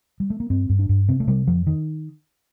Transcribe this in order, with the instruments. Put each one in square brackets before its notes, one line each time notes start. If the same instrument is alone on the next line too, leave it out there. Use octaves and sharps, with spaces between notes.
[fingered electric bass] G3
A3
A#3
G2 C4
G2
D4
G2
C3 C4
A3
C3 G3
F2 F3
D#3